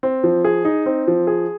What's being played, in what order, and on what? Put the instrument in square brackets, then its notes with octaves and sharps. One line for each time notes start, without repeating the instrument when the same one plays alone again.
[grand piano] C4
F3
G#4
D#4
C4
F3
G#4